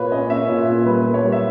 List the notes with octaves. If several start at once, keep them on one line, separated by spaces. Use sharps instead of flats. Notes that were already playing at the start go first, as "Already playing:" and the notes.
Already playing: A#2 A#3 B4 C#5
C#4 D#5
C#4 E5
A#2
A#2
G3 B4
B3
C#5
G3
E5